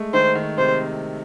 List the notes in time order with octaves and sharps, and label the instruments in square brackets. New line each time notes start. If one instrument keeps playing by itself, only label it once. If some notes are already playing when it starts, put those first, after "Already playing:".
Already playing: [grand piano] G#3 A3
[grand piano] D#3 [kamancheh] C5
[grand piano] D#3
[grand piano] C3 [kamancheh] C5